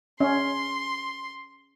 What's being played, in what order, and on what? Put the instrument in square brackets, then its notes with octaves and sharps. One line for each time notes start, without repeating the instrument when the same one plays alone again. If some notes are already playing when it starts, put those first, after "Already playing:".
[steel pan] C#4 [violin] C6